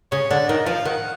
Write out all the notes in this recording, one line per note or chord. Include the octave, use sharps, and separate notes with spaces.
C#3 C#5
D3 D5
D#3 D#5
F3 F5
D#3 F#5